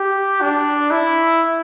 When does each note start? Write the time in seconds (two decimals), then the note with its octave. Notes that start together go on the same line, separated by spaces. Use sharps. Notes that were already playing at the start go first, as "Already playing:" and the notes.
Already playing: G4
0.42 D4
0.91 E4